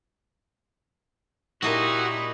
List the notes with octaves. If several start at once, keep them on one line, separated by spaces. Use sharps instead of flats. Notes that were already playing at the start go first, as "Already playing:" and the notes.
A#2 D#4 E4 F#4 G4 D#5 A5